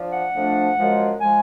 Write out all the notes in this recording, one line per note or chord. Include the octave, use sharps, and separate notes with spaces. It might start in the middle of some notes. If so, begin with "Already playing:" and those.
Already playing: F3 D4
F#5
F2 F3 A3 D4
F#2 F3 G#3
F3 G#3 G#5